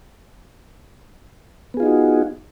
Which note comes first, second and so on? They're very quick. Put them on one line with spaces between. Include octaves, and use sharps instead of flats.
B3 G#4 F4 D#4 F#4